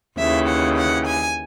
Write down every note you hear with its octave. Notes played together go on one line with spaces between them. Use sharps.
D#2 C#3 E3 E5
F#5
F#5
G#5